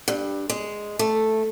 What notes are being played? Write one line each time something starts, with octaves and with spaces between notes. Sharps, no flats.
G2
G#3
A3